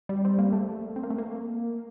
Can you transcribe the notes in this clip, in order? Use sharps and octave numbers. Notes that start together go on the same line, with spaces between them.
G3
C4
A#3
A3
C4
A#3
A3
A#3